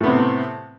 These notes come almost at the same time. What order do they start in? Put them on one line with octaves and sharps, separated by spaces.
A2 B3 C3 C4